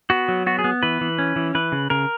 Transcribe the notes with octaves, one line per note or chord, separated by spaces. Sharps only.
B3 F#4
F#3
B3 F#4
G#4
B3
E3 B4
E3
C#4
E3
E3 B4
C#3
C#3 A#4